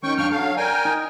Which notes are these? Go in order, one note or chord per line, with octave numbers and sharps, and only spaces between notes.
D#3 C#4 G5 C#6
F#2 D4 F5 G5 C#6 F6
F#3 A4 F5
A#4 D5 G5 G#5
D#4